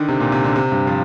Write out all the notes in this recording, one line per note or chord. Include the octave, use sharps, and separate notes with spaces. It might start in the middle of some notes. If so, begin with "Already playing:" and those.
Already playing: D3 D#3
C3
A#2
C3
D3
C3
G2
F3